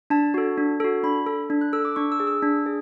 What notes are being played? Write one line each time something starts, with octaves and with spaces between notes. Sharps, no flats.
D4 A5
F#4 A4
D4
F#4 A4
D4 B5
A4
D4
F#6
A4 E6
D6
D4 C#6
E6
G#4
E6
D4
G#4